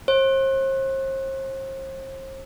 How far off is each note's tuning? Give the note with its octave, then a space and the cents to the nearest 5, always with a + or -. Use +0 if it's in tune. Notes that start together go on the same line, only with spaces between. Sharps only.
C5 +40